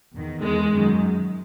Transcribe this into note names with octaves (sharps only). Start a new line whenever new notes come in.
E2 D#3
E2 D#3 G#3
F#2 D#3